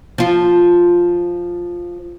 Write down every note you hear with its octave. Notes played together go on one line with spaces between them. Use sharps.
F3 F4